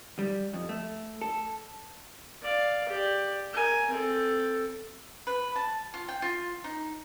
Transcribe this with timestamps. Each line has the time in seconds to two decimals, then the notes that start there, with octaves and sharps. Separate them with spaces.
0.19 G3
0.53 F2
0.69 A3
1.21 A4
2.42 D5 F5
2.89 G4 D5
3.53 A#4 G#5
3.90 C4 A4
5.27 B4
5.56 A5
5.94 F4
6.08 G5
6.22 F4
6.64 D#4